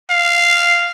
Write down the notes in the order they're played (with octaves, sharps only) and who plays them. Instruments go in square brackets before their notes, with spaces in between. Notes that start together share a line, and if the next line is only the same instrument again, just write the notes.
[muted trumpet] F5